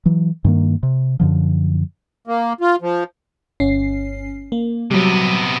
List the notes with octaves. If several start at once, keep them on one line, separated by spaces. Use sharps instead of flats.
E3 F#3
G2 D#3 A#3
C3
F#2 D3 F3
A#3
F4
F3
G1 C#4 C7
A#3
C3 F#3 G3 B3